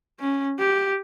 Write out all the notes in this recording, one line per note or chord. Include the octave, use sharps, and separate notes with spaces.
C#4
G4